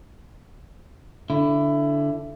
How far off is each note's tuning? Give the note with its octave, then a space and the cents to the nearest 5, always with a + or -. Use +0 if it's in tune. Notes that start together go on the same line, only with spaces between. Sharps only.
D3 -10 E4 +20